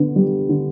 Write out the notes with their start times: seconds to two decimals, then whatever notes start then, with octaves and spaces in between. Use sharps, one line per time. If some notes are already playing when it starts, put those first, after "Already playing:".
Already playing: D3 B3
0.16 G3
0.49 D3